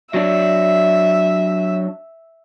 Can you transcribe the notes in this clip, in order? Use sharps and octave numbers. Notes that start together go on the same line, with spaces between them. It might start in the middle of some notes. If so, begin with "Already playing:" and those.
F#3 D4 E5